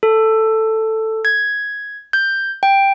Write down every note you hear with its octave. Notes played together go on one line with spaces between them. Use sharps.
A4
G#6
G6
G5